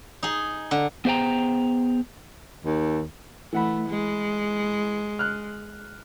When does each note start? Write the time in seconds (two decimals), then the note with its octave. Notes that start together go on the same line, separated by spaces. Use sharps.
0.23 D#4 G#4
0.71 D3
1.05 B3 G#4 C5 E5 G5 A#5
2.65 D#2
3.53 E3 A3 F#5 B5
3.89 G#3
5.19 F6 F#6